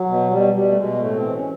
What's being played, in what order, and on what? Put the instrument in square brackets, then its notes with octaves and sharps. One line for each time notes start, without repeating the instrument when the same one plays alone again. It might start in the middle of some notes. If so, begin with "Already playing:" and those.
Already playing: [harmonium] F#3
B2
B2 G3
B2 G3
A3
B2 G#3
A2 A3
C4
E3
C#4